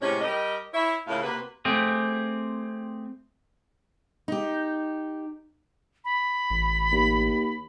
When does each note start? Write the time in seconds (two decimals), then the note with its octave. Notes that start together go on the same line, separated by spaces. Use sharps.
0.01 A2 C3 G#3 C#4
0.21 G3 G4 A#4 D#5
0.73 E4 C#5 E5
1.08 A2 C#3 A#3 E4 F4 F5
1.22 C3 A#3 F#4 B4
1.65 A3 C4 G4 G#4
4.28 D#4 G4
6.05 B5
6.51 A1
6.92 D#2